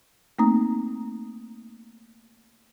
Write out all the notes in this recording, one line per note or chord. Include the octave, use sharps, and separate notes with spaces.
A3 A#3 C4 D#4 A#5 D#6